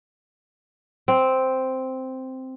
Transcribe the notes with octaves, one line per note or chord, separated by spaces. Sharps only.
C4